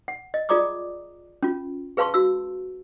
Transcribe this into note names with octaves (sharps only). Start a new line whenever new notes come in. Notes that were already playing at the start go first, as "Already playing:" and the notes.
F#5
D#5
F4 G#4 D5 A#5 D6 D#6
C#4 F4
G#4 B4 F5 A5 C6 C#6
F#4 E6